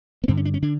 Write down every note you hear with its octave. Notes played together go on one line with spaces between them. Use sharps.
B3
G2 D3 C4
C#4
D4
C#4
D3 D4